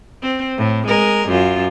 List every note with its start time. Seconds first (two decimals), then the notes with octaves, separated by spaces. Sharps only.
0.22 C4
0.57 A2
0.87 G#3 A#4
1.28 F#2 F4